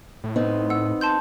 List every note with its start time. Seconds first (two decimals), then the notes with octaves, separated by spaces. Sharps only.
0.24 A2
0.36 B3 C4 D#4
0.70 F#5 E6
1.01 A5 C6 G6